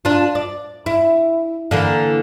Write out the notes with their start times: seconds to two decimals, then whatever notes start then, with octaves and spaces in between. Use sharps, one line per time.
0.05 D4 F4
0.35 D5
0.86 E4
1.71 D3 E3 A#3